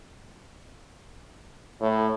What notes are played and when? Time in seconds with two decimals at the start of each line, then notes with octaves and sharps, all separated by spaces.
1.81 A2